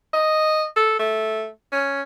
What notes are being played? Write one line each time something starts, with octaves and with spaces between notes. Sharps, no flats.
D#5
A4
A3
C#4